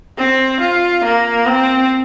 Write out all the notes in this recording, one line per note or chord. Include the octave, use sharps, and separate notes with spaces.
C4
F4
A#3
C4